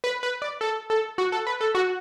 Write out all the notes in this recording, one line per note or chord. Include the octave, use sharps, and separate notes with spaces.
B4
B4
D5
A4
A4
F#4
A4
B4
A4
F#4